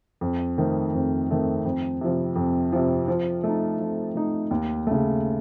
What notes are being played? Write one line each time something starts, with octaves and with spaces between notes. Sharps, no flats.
F2
D#3 A3 C4
F2
D#3 A3 C4
F2
C3 F3
F2
C3 F3
F3
A3 D#4
F3
A3 D#4
D#2
C#3 A3